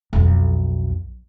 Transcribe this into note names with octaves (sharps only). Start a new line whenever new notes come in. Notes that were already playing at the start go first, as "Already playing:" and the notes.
B1 F2